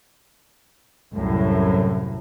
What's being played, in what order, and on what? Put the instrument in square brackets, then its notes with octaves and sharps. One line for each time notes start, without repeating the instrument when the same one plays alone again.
[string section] C2 F#2 A2